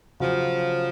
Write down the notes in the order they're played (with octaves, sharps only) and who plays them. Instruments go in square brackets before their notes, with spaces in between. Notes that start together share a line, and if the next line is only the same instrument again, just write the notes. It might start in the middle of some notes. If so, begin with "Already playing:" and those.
[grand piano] C#3 F#3 C#4 F#4 [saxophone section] F3